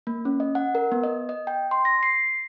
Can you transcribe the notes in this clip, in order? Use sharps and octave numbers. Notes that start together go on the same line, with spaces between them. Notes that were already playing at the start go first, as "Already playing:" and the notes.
A#3
C#4
D#5
F#5
A#4
B3
D#5
D#5
G5
C6
A#6
C7